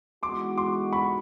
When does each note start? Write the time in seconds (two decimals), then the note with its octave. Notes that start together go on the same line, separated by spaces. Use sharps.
0.23 E3 G#3 B3 D#4 F#4 C6 D6
0.58 C6 D6
0.93 B5 C#6